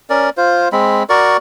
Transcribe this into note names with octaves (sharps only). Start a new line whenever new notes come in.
C#4 A#4 D5
F4 C5
G#3 C4 B5
F#4 A#4 D5 C#6